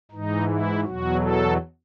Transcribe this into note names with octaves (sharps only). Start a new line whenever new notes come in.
G#2 E3 D#4
E4
E2 B2 F#3 F#4
A4